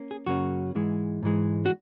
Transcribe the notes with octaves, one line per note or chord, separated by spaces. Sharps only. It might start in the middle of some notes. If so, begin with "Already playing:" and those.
Already playing: A#3 C#4
G#4
F#2 C#3 F#3 A#3 C#4 F#4
G#2 E3 G#3
G#2 E3 G#3
F#4